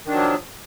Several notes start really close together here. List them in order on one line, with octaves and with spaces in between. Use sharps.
D#3 D4 F#3 F3